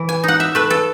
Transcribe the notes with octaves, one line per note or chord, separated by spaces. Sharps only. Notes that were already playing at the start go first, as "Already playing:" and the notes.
Already playing: E3
G#5
D#4 F#5
E5
A3 B4
A4